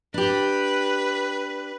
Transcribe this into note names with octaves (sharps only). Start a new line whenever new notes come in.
D4 G4 B4